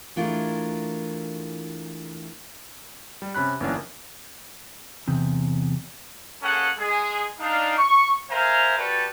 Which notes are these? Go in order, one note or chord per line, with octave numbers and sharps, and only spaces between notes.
E3 A3 D4 F4 G#4 A#4
G3
C3 C#4 B5 F#6
G1 F#2 E3 A#3 C#4 D4
E2 C3
A#3 C#4 G#4 A4 F#5
G#3 G#4
D4 D#4 F5
C#6
A#4 C5 E5 F5 G#5 A#5
F#4 G4 A4 B4 D5